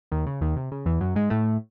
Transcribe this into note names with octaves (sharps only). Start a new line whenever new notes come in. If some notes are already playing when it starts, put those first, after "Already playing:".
D#2 D#3
C#3
D#2 D#3
C3
C#3
E2 E3
F#2 F#3
G#2 G#3
A2 A3